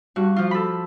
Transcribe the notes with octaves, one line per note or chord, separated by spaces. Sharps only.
G2 F#4
F3 F4
A4 B5